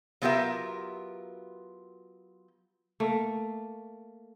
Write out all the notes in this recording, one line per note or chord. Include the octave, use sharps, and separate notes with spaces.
F#3 B3 F4 G4 A#4 E5
A3 A#3